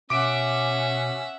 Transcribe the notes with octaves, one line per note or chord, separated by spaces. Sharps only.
B2 C#4 E5 F#5 D6 D7